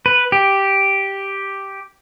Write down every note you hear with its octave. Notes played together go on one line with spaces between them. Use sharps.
B4
G4